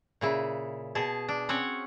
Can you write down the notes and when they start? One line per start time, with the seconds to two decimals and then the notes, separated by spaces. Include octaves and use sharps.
0.21 A#2 C#3 E4
0.95 B2 G#4 A5
1.28 D4
1.49 C4 C#4 C#5 F#5